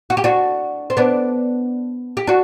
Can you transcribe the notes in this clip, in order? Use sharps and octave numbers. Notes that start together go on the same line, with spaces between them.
F#4
G4
D4 F#4
C4
B3 D4
G4
D4 F#4